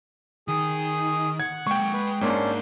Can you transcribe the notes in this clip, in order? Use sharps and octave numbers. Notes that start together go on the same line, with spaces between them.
D#3 G#4 D#6
F#5 F#6 G#6
G#3 A#3 G5 C#6
G#3 B4
G#2 A#3 C#4 D4 C5